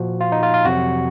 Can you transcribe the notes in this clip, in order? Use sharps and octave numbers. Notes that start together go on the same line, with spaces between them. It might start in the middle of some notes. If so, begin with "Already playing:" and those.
Already playing: A#2 F3 F#4
F4
D#4
F4
F4
F2 C3 F#3 F#4